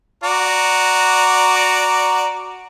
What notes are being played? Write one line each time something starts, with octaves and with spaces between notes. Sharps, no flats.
F#4 D5 A#5